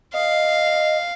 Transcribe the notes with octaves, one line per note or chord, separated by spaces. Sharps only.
D#5 F5